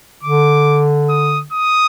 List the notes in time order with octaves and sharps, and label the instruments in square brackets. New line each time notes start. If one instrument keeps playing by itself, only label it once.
[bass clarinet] D3 [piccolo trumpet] D6
[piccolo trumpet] D#6
D#6